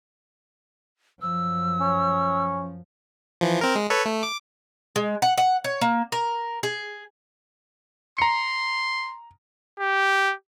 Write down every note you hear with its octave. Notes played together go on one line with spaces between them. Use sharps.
F#2 F3 E6
C#4
E3 F3
C4 A#4
G#3
A4 B4 C#5
A3
D6
G#3
F#5
F#5
C#5
A#3
A#4
G#4
A#5 C6 C#7
G4